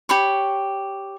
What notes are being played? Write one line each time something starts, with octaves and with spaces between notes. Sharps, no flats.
G4 C#5 B5 C#6